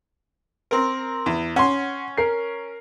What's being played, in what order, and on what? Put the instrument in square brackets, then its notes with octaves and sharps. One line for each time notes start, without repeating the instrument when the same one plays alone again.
[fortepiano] C4 A#4
E2
[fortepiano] C#4 [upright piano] F#5 C6
[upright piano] A#4 C7